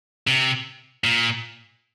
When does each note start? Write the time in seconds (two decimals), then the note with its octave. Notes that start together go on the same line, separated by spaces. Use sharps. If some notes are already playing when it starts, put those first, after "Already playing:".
0.27 C3
1.04 A#2